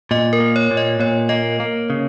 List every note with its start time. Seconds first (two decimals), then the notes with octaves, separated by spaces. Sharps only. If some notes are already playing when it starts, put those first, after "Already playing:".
0.11 A#2 D#5
0.33 A#4
0.40 A#3
0.56 C#5
0.71 A#2
0.77 D#5
1.00 A#2 C#5
1.29 A#3 D#5
1.60 A#3
1.90 C#3